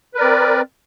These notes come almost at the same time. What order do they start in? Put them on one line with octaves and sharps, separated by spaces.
B4 A#4 D5 C4